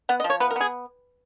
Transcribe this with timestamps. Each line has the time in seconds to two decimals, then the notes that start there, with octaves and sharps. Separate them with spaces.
0.09 B3 F#5
0.20 D#5
0.24 F3
0.30 C#5
0.40 B3 B4
0.50 A#4
0.56 B3 G#4